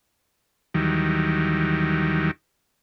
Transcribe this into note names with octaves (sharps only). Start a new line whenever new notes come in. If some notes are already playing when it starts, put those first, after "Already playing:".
D#2 D#3 E3 F#3 G3